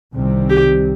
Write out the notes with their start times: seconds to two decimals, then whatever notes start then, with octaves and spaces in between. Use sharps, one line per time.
0.15 C2 C3 D#3 G3 C4
0.50 G4